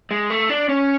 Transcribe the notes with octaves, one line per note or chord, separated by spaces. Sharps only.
G#3
A3
D4
C#4